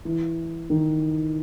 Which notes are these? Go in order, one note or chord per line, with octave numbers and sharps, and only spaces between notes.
E3
D#3